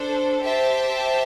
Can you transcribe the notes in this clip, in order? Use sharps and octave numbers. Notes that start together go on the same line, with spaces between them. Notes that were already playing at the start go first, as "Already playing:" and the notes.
Already playing: D4 A4 C5
G4 C5 E5 A5